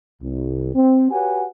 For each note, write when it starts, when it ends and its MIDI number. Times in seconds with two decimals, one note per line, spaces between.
0.22 0.71 36
0.75 1.10 60
1.11 1.46 66
1.11 1.46 67
1.11 1.46 71
1.11 1.46 73
1.11 1.46 78
1.11 1.46 80